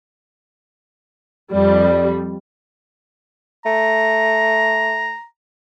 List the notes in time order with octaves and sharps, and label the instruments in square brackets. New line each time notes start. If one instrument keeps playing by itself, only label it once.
[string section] F2 G3 [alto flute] D5
[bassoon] A3 [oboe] A#5